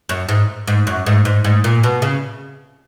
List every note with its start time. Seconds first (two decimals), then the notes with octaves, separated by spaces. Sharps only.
0.09 F#2
0.29 G#2
0.68 G#2
0.87 F#2
1.06 G#2
1.25 G#2
1.44 G#2
1.64 A#2
1.84 B2
2.02 C#3